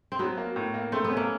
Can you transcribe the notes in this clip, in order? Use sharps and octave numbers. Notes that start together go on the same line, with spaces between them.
C4
F#3 B3
A#3
A2
A#3
A3 C4
B3
C#4
A#3